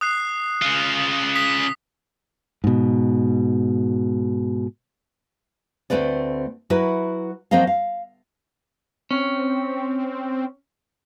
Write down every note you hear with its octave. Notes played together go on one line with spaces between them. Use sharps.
D#6 F#6 C7
C#3 F4
D#6 B6
G#2 B2
D2 G2 A3 C4 B4 D5
F#3 E4 F#4 A#4 B4
F3 F#3 C4 A#4 D#5 F5
F5
C4 C#4